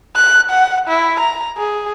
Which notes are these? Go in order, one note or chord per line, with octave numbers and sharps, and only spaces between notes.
F#6
F#5
E4
A#5
G#4